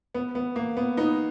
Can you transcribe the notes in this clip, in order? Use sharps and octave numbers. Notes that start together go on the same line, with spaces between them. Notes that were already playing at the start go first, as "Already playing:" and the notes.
B3
B3
A#3
B3
B3 D#4